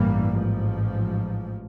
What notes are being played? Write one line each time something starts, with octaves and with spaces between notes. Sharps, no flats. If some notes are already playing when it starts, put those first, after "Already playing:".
Already playing: A1 G2 E3 G3 A#3
A1 G#2 F3